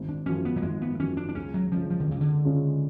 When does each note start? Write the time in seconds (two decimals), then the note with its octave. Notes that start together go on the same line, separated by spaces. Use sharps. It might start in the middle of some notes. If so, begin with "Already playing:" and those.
Already playing: G#1
0.09 D4
0.26 F#2 F3 C#4
0.45 B3
0.56 F#3
0.62 G#1 G#3
0.82 B3
0.99 F#2 F3 C#4
1.17 D4
1.29 D4
1.35 C#2 C#4
1.54 F#3
1.72 C#3 F3 G#3 C#4 F4
1.90 F3
2.00 D3
2.08 C#2 C#3
2.21 D3
2.45 C#3 G#3 C#4 F4